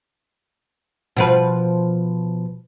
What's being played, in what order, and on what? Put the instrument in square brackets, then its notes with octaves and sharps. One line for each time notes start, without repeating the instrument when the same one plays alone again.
[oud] B2 F3 B4